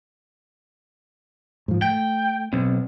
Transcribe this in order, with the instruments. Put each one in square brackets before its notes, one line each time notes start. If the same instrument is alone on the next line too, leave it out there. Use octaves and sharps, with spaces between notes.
[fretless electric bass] G#2 F3
[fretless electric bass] A3 [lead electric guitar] G5
[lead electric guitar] B1 [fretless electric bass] C4